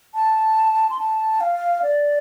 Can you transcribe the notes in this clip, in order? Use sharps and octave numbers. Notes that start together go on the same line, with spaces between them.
A5
C6
A5
F5
D5